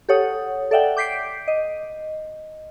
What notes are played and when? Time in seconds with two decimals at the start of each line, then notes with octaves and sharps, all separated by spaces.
0.09 G4 A4 C#5 F#5 D#6
0.71 A4 D5 E5 F#5 G5
0.97 D6 G6 B6 C7 D7
1.48 D#5